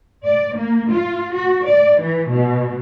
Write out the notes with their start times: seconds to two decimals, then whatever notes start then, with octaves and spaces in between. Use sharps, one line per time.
0.24 D5
0.56 A#3
0.90 F4
1.34 F#4
1.66 D5
1.99 E3
2.31 B2